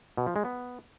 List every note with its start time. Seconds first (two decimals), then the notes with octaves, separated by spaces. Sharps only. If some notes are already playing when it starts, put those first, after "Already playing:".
0.17 B2
0.27 F3
0.36 G#3
0.45 B3